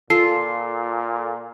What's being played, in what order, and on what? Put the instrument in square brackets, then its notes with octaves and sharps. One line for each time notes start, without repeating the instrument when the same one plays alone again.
[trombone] A#2 [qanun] F4 [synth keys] A4 [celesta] C7